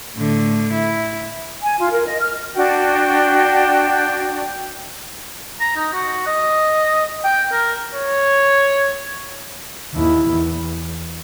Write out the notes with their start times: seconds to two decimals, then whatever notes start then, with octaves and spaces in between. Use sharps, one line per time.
0.16 A2 D3
0.73 E4
1.63 G#5
1.79 F4
1.92 A#4
2.07 D#5
2.21 F6
2.56 D4 F#4 G5
5.60 A#5
5.76 D#4
5.93 F#4
6.27 D#5
7.24 G5
7.52 A#4
7.95 C#5
9.94 D#2 E4
10.29 E2